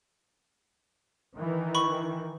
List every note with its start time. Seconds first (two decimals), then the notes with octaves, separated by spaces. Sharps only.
1.35 D#3 E3
1.75 B5 C#6